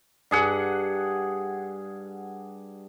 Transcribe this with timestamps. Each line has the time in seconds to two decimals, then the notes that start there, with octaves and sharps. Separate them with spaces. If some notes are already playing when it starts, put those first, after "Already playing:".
0.31 G2 G#4 F#5